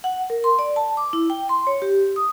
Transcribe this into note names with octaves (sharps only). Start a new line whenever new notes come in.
F#5
A#4
C6
D5
A5
D6
E4
G5
C6
C#5
G4
D#6